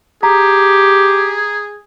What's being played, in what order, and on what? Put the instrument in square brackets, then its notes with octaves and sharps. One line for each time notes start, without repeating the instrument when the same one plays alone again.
[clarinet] G4 [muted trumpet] G#4 [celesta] A#5